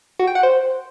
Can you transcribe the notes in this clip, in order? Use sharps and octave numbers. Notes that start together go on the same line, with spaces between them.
F#4
G5
F#5
C5